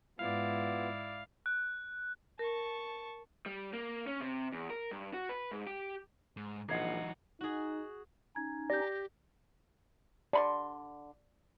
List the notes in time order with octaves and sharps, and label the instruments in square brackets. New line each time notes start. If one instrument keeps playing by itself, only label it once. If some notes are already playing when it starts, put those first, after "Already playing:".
[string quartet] G#2 [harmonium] B3 F4 [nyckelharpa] E4 D5 [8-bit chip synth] F5
[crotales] F#6
[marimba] A#4 [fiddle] A5 C#6
[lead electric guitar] G3
A#3
C#4
C3
E2
A#4
G2
F#4
B4
G#2
G4
G#2
[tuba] A#1 [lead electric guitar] E3 F#3 [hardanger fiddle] D#4 F#5 [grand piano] D#5 G#6 C7
[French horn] D#4 [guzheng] F#4 G#4
[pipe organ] C#4 D#4 [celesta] G#6
[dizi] G4 [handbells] D5 [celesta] G6 A#6
[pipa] D3 B5 C6 [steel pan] D5